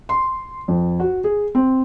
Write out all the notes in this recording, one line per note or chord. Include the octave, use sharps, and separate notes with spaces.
C6
F2
F#4
G#4
C4